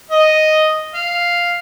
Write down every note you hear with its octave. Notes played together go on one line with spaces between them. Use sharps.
D#5
F5